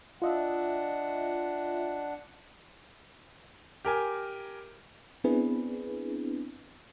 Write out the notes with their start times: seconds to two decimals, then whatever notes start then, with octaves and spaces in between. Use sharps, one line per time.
0.22 D4 F4 D#5 E5 F#5
3.85 G4 A#4 G#5
5.24 B3 C4 D4 E4 G#4 B4